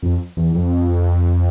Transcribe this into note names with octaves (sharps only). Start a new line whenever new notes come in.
F2
E2
F2